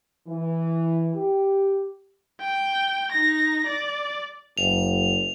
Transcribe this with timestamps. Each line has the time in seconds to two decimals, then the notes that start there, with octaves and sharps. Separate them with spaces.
0.28 E3
1.15 G4
2.41 G5
3.12 D#4 A#6
3.67 D5
4.58 F#1 F7